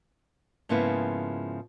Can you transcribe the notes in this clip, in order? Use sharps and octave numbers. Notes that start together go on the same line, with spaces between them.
G#2 C#3 F3 A#3 B3 E4